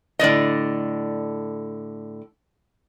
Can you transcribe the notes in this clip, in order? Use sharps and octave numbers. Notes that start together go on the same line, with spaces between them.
A2 D3 D5 D#5